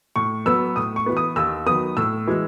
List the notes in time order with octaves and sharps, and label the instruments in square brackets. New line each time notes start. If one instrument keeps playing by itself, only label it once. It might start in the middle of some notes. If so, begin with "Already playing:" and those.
[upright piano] A2 C#6
F#3 B3 E6
A2 D#6
C#6
E3 B3
D#6
D#2 E6
D#3 F#3 B3 D#6
A2 E6
E3 G#3